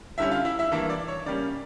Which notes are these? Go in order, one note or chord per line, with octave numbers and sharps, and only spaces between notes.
D3 G3 C#4 E4 E5
F4 F5
E4 E5
E4 E5
G2 E3 A#3 E4 E5
D5
C#5
C#3 G3 A#3 C#4 D5